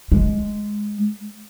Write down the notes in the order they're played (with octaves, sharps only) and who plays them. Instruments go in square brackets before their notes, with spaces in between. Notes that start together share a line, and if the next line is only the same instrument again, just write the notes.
[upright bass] G#3